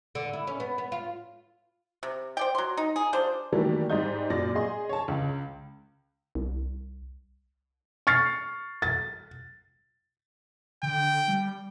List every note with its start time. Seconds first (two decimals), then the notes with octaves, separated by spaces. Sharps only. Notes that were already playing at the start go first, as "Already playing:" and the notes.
0.15 D3
0.33 E4
0.47 C#4
0.60 B3
0.78 B3
0.92 F4
2.03 C3
2.37 C5 D5 G5
2.55 F#3 C6
2.77 D#4
2.96 G#4
3.13 G3 D4 F4 C5
3.53 D#3 E3 F#3 G3 A3 A#3
3.90 G#2 G3 D#5 G6
4.30 F#2 A#2 D5 A#6
4.55 G#4 D#5 C6
4.89 C#5 A5
5.08 C#2
6.35 C2
8.07 C#6 F6 A6 C7 C#7
8.82 A6
10.83 D3 G5
11.28 G3